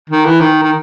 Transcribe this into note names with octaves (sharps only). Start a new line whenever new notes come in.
D#3
E3
D#3
D#3